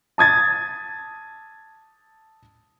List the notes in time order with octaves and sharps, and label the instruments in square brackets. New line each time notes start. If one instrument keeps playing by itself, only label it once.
[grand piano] A5 D#6 G#6 A6